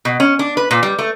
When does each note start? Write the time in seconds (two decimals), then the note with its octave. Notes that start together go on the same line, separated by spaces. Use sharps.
0.05 B2
0.20 C#4
0.39 D4
0.57 B4
0.71 A#2
0.83 G3
0.99 A3